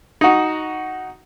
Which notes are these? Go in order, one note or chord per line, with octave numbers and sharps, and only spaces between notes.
D#4 F#4